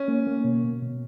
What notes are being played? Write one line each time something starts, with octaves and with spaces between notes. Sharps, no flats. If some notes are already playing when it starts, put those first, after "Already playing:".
Already playing: C#4
A#3
A#3
B2
B2
B2